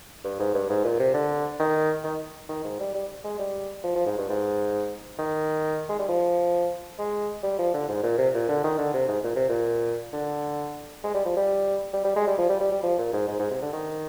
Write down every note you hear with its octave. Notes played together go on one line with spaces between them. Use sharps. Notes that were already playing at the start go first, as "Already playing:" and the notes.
G2
G#2
G2
G#2
A#2
C3
D3
D#3
D#3
D#3
G#2
G3
G3
G#3
G3
F3
F3
G#2
G2
G#2
D#3
G#3
G3
F3
G#3
G3
F3
D3
G#2
A#2
C3
A#2
D3
D#3
D3
C3
G#2
A#2
C3
A#2
D3
G#3
G3
F3
G3
G3
G3
G#3
G3
F3
G3
G3
G3
F3
A#2
G#2
G#2
G#2
C3
D3
D#3